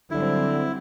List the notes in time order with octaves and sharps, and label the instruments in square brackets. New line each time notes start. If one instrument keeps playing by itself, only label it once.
[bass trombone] D3 [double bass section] F#3 G3 C4 [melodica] E4